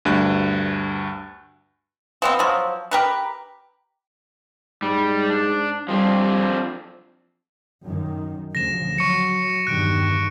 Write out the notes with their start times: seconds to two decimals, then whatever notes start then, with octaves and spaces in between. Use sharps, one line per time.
0.05 D2 G2 F#6
2.22 F3 B3 C4
2.39 F3 F#3
2.91 G4 A#4 B4
4.83 G#2 G3
5.30 D4
5.89 F3 G3 C4 D4
7.85 F#2 D#3
8.55 D2 C#3 F3 A#6 E7
8.98 F#3 C#6 C#7
9.67 E2 G2 D#3 F#6 D7